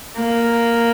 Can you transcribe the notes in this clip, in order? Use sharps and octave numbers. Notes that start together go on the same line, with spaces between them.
A#3